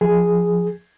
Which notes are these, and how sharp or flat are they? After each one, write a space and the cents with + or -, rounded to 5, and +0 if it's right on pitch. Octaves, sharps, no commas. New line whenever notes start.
F3 +0 G#4 +0